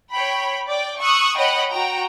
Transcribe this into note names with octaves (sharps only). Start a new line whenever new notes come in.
C#5 G5 B5
D5 G5
C#6 D#6 E6 F#6
C#5 D#5 F#5 G5 B5
F#4 G5 A#5